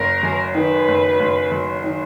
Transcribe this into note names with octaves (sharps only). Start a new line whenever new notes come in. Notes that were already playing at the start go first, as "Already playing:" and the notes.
Already playing: F#1 A#4
F#2
D#3 B4
F#1
F#1
F#2
D#3